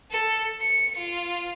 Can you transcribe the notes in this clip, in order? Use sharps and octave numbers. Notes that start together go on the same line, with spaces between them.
A4
C#7
F4